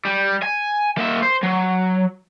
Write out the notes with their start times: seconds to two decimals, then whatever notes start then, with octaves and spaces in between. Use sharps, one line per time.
0.05 G3
0.42 G#5
0.97 A#3 E5
1.22 C5
1.43 F#3